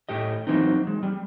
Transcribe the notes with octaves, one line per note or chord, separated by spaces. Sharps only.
A2 A3 G4 D#5
E3 F#3 A#3 C4 D#4
G#3
G3